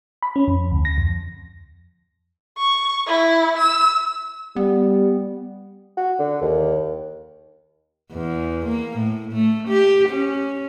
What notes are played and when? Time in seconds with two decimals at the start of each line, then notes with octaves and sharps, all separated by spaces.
0.23 B5
0.36 C#4
0.48 F2
0.72 D2
0.85 A#6
0.98 F2
2.57 C#6
3.07 E4
3.57 E6
4.56 G3 B3
5.97 F#4
6.19 D3
6.42 D#2
8.13 E2
8.67 A#3
8.97 A2
9.32 A3
9.68 G4
10.09 C#4